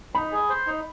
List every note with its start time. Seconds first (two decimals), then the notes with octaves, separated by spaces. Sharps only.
0.14 D#4 B5
0.32 G#4
0.50 C5
0.67 D#4